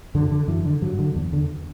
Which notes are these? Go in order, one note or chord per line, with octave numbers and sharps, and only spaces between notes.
F#2 D3
D3
F#2 E3
D3
G2 F#3
D3
E2
D3